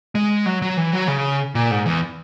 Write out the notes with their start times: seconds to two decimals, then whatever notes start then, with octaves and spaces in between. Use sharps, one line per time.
0.15 G#3
0.46 F#3
0.62 F#3
0.77 E3
0.93 F#3
1.08 C#3
1.55 A#2
1.71 G#2
1.86 E2